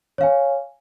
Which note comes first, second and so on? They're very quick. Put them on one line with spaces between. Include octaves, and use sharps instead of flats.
C#5 F5 G#5